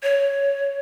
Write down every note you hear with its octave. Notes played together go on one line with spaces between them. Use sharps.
C#5